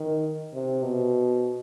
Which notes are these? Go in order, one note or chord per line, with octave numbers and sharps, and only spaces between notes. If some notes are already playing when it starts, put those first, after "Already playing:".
Already playing: D#3
C3
B2